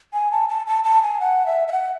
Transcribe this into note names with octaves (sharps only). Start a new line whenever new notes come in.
G#5
A5
A5
A5
A5
G#5
F#5
E5
E5
F#5